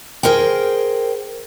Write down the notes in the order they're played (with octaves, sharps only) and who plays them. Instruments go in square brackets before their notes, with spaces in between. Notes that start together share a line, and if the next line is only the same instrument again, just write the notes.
[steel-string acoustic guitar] G#4 A#4 C5 G5